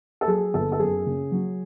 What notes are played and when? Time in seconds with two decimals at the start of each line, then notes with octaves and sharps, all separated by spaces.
0.21 A4
0.27 F#3 G#4
0.54 G1 A4
0.72 A4
0.79 F#2 G#4
1.06 C#3
1.32 F#3